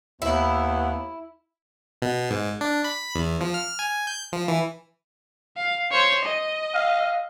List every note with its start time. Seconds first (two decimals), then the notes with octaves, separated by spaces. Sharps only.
0.22 D#2 B3 E4
2.02 B2
2.30 G#2
2.61 D4
2.84 B5
3.15 E2
3.41 F3
3.54 F6
3.79 G#5
4.07 G6
4.33 F3
4.48 E3
5.57 F5
5.91 C5 C#5
6.25 D#5
6.74 F5